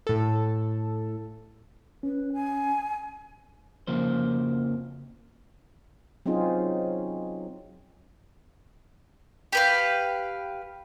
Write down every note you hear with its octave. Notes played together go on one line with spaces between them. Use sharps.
A2 A4
C#4 B4
G#5
F2 C#3 F3 A#3 C5
F#3 C4 C#4 D#4 F4 G#4
G4 B4 F5